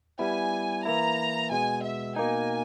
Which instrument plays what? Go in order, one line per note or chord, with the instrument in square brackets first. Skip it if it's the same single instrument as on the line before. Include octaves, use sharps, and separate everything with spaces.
[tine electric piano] G3 B3 E4 [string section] G#5
[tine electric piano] E3 A#3 E4 [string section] A#5
[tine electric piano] B2 G#3 B3 [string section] G#5
[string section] E5
[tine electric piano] B2 A#3 D#4 [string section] G#5